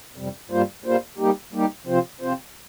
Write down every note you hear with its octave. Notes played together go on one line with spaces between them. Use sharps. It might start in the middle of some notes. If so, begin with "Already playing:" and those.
F2 C3 G3
G2 G3 A#3 F4 C5
G2 G3 A#3 F4 C5
G3 A#3 D#4 G4
G3 A#3 D#4 G4
C3 F3 C4 F4 C5
C3 F3 C4 F4 C5